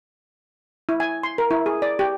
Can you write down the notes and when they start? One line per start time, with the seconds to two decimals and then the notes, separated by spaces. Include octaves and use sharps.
0.89 E4
1.00 G#5
1.23 C6
1.38 A#4
1.51 E4
1.66 G#4
1.82 D5
1.99 G4